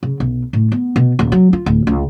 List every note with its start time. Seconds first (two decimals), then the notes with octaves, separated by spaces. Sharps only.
0.03 C#3
0.20 B1
0.53 A2
0.72 B3
0.96 B2
1.19 D#1
1.32 F#3
1.53 F4
1.66 D1
1.87 C#2